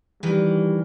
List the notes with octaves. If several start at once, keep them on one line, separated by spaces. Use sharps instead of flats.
D#3 E3 G3